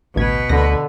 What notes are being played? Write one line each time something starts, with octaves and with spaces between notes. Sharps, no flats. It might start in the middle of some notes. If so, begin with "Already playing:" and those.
A1 D2 B2 B4 G#6
D2 D3 A#6